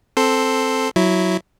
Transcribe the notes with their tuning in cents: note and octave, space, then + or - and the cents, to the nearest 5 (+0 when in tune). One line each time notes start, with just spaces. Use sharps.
C4 +0 A4 +0 C6 +0
F#3 +0 E4 +0